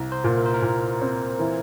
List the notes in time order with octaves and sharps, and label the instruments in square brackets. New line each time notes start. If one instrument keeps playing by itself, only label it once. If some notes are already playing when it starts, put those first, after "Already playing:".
Already playing: [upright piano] C2
[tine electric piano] C5
[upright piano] A#2
[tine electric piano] A#4
C5
A#4
[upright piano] A#2
C4
E3